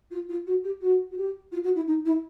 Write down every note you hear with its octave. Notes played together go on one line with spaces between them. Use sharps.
F4
F4
F#4
G4
F#4
F#4
G4
F4
F#4
E4
D#4
E4